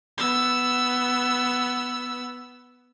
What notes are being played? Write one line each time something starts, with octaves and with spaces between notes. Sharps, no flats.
B3 E6